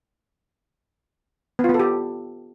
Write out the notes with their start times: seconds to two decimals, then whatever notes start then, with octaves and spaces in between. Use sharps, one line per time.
1.59 B3
1.64 F4
1.69 B3
1.74 A4
1.79 G4